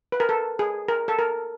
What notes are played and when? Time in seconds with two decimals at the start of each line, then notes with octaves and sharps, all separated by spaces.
0.12 B4
0.20 A#4
0.29 A4
0.59 G#4
0.88 A#4
1.08 A4
1.19 A#4